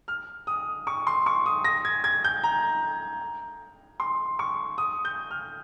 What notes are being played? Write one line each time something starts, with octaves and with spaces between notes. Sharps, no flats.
F6
D#6
C#6
C6
C#6
D#6
A#6
G#6
G#6
G6
A#5
C6
C#6
D#6
G6
F6